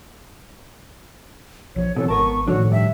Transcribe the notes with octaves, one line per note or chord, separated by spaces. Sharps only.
A#1 F3 C#5
B2 E3 F#3 C4 A4
G#1 B3 A#4 A5 C#6
A2 D#3 F3 D4 F#4 A4 C#5
G2 E5